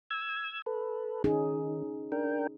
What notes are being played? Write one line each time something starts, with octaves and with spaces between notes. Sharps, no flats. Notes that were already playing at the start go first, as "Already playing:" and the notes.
E6 G#6
A4 B4
D#3 C#4 D#4 G#4
D4 A#4 G5